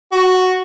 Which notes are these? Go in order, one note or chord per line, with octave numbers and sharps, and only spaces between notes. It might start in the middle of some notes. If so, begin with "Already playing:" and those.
F#4